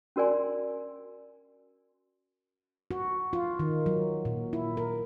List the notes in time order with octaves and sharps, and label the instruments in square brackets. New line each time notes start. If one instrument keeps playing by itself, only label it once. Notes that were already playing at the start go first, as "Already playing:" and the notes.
[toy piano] C#4 F#4 A#4 D5 G#5 C6
[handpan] F#4
F4
D#3
F#3
A#2
E4
A#4